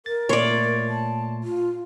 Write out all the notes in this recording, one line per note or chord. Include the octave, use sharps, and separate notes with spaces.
A#4 A6
A#2 A3 C#5 D5 C6
A5
F4